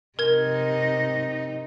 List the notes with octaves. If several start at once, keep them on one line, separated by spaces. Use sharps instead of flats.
C3 D#4 A#4 G#6